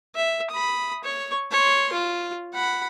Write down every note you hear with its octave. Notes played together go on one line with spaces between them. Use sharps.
E5
B5 D#6
C#5 C#6
C#5 C6
F4
F#5 B5